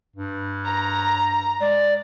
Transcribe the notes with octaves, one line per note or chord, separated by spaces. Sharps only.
G2
A#5
G#3 D5